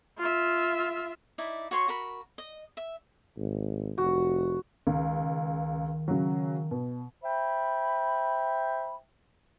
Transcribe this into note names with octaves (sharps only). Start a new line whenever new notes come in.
F4 E5
D#4 E4 D5 E5
F#4 C#5 C6 C#6
F#4 A#4 B5
D#5
E5
G#1
F1 F#4
C#2 D#3
C#3 F#3
B2
C5 E5 G5 B5